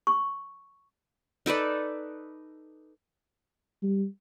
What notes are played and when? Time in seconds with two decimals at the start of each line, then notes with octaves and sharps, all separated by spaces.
0.07 C#6
1.46 D#4 A4 B4 D5
3.83 G3